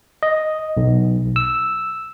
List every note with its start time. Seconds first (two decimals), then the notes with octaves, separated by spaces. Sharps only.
0.23 D#5
0.77 B1
1.36 E6